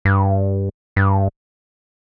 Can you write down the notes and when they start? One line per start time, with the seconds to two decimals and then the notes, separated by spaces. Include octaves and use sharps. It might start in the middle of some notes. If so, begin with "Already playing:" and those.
0.05 G2
0.96 G2